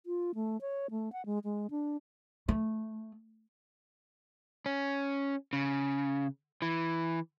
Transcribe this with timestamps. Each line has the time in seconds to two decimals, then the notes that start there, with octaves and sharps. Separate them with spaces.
0.06 F4
0.35 A3
0.61 C#5
0.91 A3
1.13 F#5
1.26 G#3
1.44 G#3
1.71 D4
2.49 A3
4.66 C#4
5.53 C#3
6.62 E3